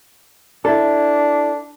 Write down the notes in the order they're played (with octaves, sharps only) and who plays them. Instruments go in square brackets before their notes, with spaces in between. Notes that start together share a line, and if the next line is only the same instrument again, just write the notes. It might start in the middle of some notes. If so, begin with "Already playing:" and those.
[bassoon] D4 [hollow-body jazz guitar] E4 A4